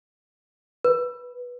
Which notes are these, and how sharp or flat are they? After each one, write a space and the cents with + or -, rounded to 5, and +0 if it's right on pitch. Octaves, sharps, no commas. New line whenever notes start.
B4 -10